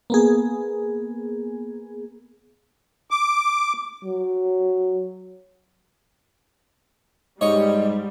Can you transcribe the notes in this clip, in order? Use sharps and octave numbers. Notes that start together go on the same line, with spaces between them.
A#3 B3 G#4
D6
F#3
G#2 G3 C#5 D#5 C#6